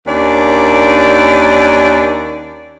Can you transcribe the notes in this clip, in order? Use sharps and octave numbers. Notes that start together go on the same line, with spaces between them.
D#2 C#4 D4 D5